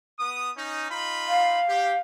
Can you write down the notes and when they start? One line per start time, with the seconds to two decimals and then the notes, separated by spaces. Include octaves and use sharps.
0.18 B3 D#6
0.56 C#4 D#4
0.88 D#4 F4 B5
1.28 F5
1.66 G4